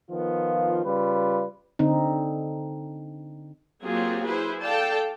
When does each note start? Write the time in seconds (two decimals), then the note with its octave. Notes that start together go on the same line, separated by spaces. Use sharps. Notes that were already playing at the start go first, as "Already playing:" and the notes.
0.11 D#3 F3 B3 F4
0.86 C#3 G3 F4 B4
1.79 D3 C4 D#4
3.84 F#3 A#3 C4 F4 G4 G#4
4.27 E4 G#4 B4 C5
4.61 A4 D5 F5 G5 A5